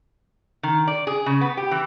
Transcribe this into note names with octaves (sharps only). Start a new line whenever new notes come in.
D#3
D5
G#4
C#3
B3
G4
E3